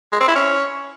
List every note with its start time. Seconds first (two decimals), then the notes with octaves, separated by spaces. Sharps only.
0.13 G#3
0.20 C4
0.28 E4
0.35 C#4